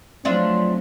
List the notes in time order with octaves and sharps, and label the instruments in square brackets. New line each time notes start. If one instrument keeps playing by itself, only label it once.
[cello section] F3 F#3 A3 [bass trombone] C4 [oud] D4 F4 E5